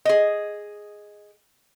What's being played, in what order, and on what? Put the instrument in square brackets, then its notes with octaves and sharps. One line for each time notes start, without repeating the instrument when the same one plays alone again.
[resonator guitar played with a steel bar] G#4 D#5